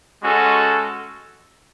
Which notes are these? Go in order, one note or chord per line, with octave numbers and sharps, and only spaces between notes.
G#3 C#4 F#4 A4